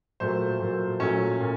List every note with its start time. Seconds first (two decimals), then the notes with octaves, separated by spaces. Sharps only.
0.20 A#2 F#3 A3 C5
0.60 A#2 F#3 A3
1.00 A#2 F#3 A3 C#4 C#5
1.40 A#2